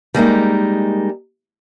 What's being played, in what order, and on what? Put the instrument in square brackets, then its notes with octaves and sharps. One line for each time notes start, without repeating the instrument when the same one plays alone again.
[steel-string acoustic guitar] G3 G#3 A#3 D#4